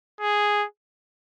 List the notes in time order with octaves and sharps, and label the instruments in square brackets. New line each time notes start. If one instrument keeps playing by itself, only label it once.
[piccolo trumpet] G#4